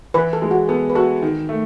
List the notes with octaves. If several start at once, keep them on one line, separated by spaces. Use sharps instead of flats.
E3 B4
A4
G#3
F#4
B3 A4
B4
F#4 A4
D#3
A3